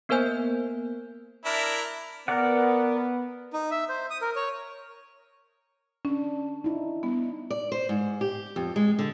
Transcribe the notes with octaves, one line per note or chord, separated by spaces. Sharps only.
A#3 B3 A#4 C5 G#5 G6
D4 E4 A#4
B3 A#4 D5 F#5
D#4
E5
C5
D#6
A#4
C#5
C#4 D4
D#4 E4
G3 B3
D5
C5
G#2
G4
F2
G#3
D3